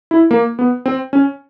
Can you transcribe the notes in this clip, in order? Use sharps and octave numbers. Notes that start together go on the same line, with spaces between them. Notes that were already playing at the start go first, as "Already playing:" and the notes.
E4
A#3
B3
C4
C#4